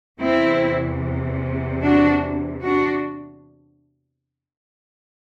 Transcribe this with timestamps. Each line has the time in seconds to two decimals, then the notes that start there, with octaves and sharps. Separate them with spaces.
0.20 E2 C3 E3 C4 E4
1.82 D4 F#4
2.62 D4 F#4